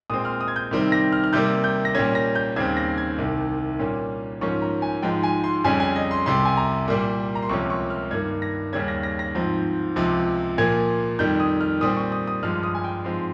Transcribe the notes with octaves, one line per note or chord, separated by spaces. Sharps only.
A#2 G#3 C4 D#6
F6
D#6
G#6
G6
C3 D#3 G3 C4
A#6
F6
F6
C3 G3 A#3 G6
G6
A#6
A#2 G3 A#3 C#4 G#6
A#6
G6
D#2 C#3 G3 C4 G#6
A#6
G#6
C2 C3 D#3
A#2 G3 A#3 C#4
G#2 F3 A#3 C#4 C#6
A#5
G#5
G#2 F3 G#3 G5
G#5
C6
F2 C#3 G3 C#4 G#5
G#5
D#5
C6
C2 C3 G3 C6
G#5
A#5
A#2 G3 A#3
A#5
C6
C#2 C3 F3 A#3 C#4 C#6
C#6
F6
G2 D#3 A#3 G#6
A#6
D#2 C#3 G3 C#4 G#6
A#6
A#6
A#6
G#2 F3 C4
C#2 C3 F3
A#2 F3 A#3 G#6
F2 D#3 G3 G6
D#6
F6
A#2 G3 C4 D#6
C#6
D#6
D#6
G2 F3 G#3 F6
D#6
G#5
G5
G#2 F3 G#3 C4